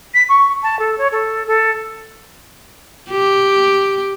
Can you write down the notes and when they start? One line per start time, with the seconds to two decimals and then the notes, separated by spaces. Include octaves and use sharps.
0.14 B6
0.29 C#6
0.63 A5
0.79 A4
0.98 C#5
1.12 A4
1.47 A4
3.10 G4